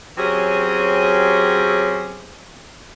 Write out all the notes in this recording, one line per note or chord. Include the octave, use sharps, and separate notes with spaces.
F#3 C4 C#4 G4 G#4